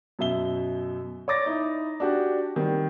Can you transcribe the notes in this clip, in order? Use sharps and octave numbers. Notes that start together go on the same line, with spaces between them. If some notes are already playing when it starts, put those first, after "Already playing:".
F#2 B2 E5 G7
C#5 D5 D6 A6 A#6
D#4 E4
D4 F#4 G4
D#3 G3 C4